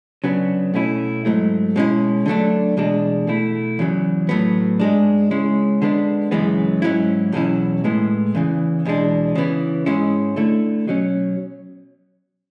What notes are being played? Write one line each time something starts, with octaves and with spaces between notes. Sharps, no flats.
C#3 F#3 B3 D4
B2 A3 C#4 E4
G#2 F#3 A3 E4
B2 G#3 C#4 E4
D3 F#3 A3 D4
E2 B2 G#3 D4
B2 A3 E4
E2 C#3 F#3
A2 F#3 B3
G#2 G#3 D4
C#3 G#3 C#4 E4
D3 G#3 B3 D4
F#2 C#3 E3 G#3 B3
G#2 F#3 C#4 E4
E2 B2 F#3 C#4 E4
A2 G#3 B3 E4
E2 C#3 E3
E2 B2 G#3 D4
C#3 E3 B3 E4
G#2 G#3 C#4 E4
D3 A3 E4
B2 F#3 C#4